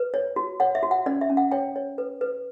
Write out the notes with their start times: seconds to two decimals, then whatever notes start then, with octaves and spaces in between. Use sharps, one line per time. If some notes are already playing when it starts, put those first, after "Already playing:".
Already playing: B4
0.14 C#5
0.36 F#4
0.60 C#5 F#5
0.75 E5
0.83 F#4
0.91 F#5
1.06 C#4 D5
1.21 E5
1.30 C#4
1.37 F#5
1.51 C#5 G5
1.76 C#5
1.98 B4
2.21 B4